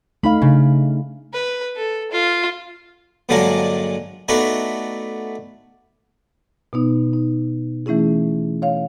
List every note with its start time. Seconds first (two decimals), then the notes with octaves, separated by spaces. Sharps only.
0.23 A3 D#4 F5 B5
0.42 C#3 D4
1.33 B4
1.76 A4
2.12 F4
3.29 G2 A#2 D3 F#3 G#3 D4
4.28 A3 B3 D4 D#4 F#4
6.73 B2 B3 D#4
7.13 D#4
7.86 E3 A3 C#4 E4 G#4
8.62 C#5 F5